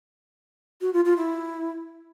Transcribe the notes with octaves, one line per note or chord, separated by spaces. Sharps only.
F#4
F4
F4
E4